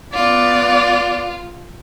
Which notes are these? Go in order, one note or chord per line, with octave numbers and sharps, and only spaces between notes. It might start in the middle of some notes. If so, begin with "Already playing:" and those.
B3 F4 D5